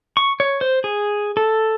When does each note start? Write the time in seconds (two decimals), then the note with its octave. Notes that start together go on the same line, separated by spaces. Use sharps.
0.17 C#6
0.40 C#5
0.61 C5
0.84 G#4
1.37 A4